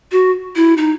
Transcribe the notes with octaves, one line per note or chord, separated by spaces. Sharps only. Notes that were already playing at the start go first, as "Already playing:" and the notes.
F#4
E4
D#4